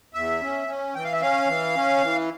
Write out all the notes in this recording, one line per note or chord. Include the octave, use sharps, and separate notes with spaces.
E2 E5
C#4
C#4
E3 G5
F5
E5
C#4 F5
E3
C#4
E3